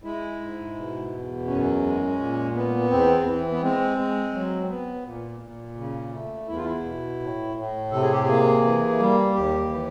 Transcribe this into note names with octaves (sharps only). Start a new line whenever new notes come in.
G#3 E4
G#2
B2
E2
F#2 C#4
G#3
A#2
B3
E2 C4
E3
B3
G#3 C4
G#3
F#3
B3
A#2
A#2
C#3
A3
E2 E4
F4
E4
B2
A2
A2
C3 A4
G#4
G4
A#3 G#4
E3
G3
D#2 G4
E3